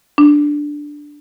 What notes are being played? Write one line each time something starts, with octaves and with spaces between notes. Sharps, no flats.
D4